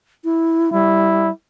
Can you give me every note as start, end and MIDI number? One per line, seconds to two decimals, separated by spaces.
0.24 0.69 64
0.73 1.30 55
0.73 1.30 64